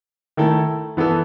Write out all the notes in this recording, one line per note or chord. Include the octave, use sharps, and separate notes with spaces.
D#3 A3 E4 A4
E3 B3 E4 A4